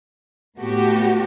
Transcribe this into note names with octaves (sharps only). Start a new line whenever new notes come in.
A2 A3 B3 F#4 G4